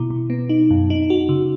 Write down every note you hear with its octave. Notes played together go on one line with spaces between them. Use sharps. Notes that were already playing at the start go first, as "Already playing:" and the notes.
Already playing: B2 E4
B2
B3
D#4
F#2
D#4
F#4
C#3